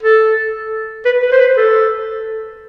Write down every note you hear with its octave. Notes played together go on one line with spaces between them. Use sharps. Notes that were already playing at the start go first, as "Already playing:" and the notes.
A4
B4
B4
C5
B4
A4